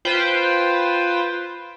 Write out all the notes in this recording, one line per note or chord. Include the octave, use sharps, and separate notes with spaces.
F4 B4 C5 G5